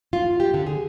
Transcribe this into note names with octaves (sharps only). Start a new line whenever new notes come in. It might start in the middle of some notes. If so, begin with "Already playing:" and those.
F4
G4
D3
G#4